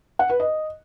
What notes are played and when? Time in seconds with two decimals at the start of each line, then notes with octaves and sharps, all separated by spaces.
0.19 F#5
0.30 B4
0.40 D#5